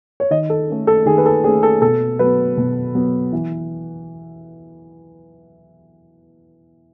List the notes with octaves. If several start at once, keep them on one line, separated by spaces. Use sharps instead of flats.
C#5
D#3 D#5
A4
A3 C#4
A4
D#3 G#4
B4
A4
A3 C#4 G#4
A4
B2 A4
F#3 B3 B4
B2
F#3 B3
E3